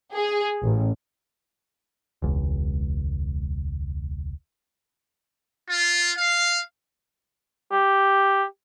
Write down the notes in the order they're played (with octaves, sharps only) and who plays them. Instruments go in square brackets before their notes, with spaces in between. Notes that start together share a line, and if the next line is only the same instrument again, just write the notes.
[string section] G#4
A1
[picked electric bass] E1 C#2
[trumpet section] F4
F5
[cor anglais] G4